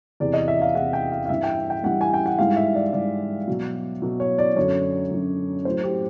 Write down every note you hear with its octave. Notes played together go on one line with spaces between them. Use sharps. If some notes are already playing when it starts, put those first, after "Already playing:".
E2 C3 E3 D5
D#5
E5
F5
E2 C3 E3 F#5
G5
F5
F5
G2 E3 G3 E5
G5
G5
G2 E3 G3 F#5
G#5
G5
F#5
G#2 E3 G3 F5
E5
D5
G#2 E3 G3 D5
B2 F#3
B2 F#3
C#5
D5
F#2 D3 F#3 C#5
F#2 D3 F#3
A2 F#3 C5
G4